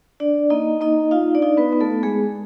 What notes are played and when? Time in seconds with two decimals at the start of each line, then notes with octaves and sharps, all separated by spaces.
0.20 D4 D5
0.50 A#3 D#4 D#5
0.81 A#3 D#4 D#5
1.11 D#4 F4 F5
1.35 D4 D5
1.42 D#4
1.57 B3 B4
1.72 B3
1.80 A3 A4
2.03 G#3 G#4